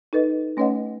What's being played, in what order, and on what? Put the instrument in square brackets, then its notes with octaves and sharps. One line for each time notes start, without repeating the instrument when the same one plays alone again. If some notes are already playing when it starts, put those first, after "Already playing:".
[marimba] D#4 A4 B4 D#5
A3 C#4 B4 C#5 D#5 F#5